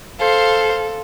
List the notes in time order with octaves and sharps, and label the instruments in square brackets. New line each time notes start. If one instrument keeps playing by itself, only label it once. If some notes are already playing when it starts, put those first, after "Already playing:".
[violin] A4 [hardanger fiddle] C5 F5